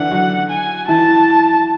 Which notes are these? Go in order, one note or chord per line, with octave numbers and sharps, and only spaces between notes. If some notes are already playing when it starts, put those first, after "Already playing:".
Already playing: D3 E3 D4 E4 F#5
F#3 F#4
G#5
E3 E4 A5